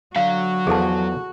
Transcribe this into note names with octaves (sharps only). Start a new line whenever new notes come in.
D3 F#3 F#4 F5
E2 F3 G#4 A4 A5